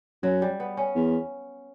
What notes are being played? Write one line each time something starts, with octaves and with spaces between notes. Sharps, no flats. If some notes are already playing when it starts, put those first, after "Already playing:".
F#2 F#3
G3
B3
C#4
E2